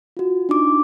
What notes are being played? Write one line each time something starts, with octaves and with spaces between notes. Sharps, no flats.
F4 F#4
D4 D#4 D6